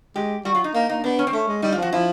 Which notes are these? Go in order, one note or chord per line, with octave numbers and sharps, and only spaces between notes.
G#3 G4
G3 F#4
F#3 F4
D#4
A#3 D#4
A#3 D#4
B3 D4
C#4
C4
A3 C#4
G#3
G3 D#4
F4
F3
F#4
F3 E4